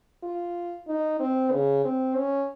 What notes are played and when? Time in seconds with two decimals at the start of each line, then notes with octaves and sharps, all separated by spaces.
0.23 F4
0.87 D#4
1.20 C4
1.52 C#3
1.84 C4
2.16 C#4